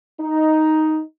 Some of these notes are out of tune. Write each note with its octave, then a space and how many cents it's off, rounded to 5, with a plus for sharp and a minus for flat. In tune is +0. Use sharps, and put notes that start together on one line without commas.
D#4 +5